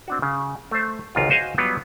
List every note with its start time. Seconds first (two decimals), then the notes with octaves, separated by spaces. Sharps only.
0.08 C4 D4 F#4
0.22 C#3
0.71 A3 C5
1.15 G#1 C#2 G#2 F4
1.30 F#4 C5 D#5 F5 G#5
1.58 F#3 G3 B3 F4